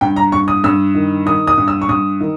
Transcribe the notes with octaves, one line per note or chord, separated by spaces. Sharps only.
G2 G5
A#5
G2 C#6
D#6
G2 E6
D#3
D#3 D#6
D#6
G2
E6
C#6
G2 D#6
D#3